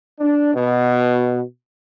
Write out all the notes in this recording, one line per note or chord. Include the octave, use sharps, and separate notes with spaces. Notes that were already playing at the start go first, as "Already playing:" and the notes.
D4
B2